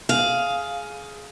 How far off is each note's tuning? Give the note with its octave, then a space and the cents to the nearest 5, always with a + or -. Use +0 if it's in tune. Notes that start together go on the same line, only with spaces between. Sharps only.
G#4 +15 F5 +0